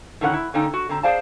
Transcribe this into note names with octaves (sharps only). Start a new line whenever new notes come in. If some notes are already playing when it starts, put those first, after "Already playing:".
A2 D3 D#3 C#4 C5 F#5
E4
D3 A#3 C#4 D#4 G5
F#4
D3 C4 A#5
G#4 C5 D5 F5 A5